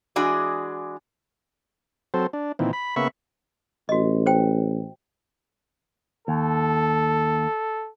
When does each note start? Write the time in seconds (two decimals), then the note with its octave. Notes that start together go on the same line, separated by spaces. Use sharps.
0.16 E3 G#3 D4 F#4 G#4 D5
2.14 F#3 C4 A4 C5
2.33 D4
2.59 A#2 D#3 E3 C4
2.73 B5
2.96 C#3 A#3 B3 E5 B5 C#6
3.89 A1 F#4 D#5
4.26 C5 G5
6.28 D#2 A4